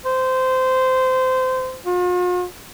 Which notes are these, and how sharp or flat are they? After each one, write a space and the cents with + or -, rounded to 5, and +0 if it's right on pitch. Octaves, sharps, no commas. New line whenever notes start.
C5 -20
F4 +45